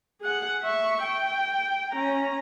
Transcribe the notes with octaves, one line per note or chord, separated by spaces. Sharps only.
G#4 F#5
E5 C#6
G5
C#4 A#5